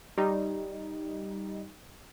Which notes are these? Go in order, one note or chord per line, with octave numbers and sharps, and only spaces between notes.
G3 D#4 G4